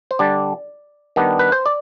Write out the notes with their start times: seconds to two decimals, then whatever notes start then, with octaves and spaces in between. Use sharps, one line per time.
0.11 C5
0.19 D3 G3 D4 D5
1.16 D#3 G3 B3 D4
1.39 B4
1.52 C5
1.66 D5